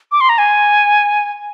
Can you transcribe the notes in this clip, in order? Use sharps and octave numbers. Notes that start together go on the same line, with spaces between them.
D6
C6
A#5
G#5